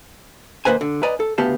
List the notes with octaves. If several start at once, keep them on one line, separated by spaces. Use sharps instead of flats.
D#3 G3 A#3 B4 C5 G#5
D3
B4 D5 D#5 G#5 A#5
A4
D2 C#3 B3 G4 F5 A5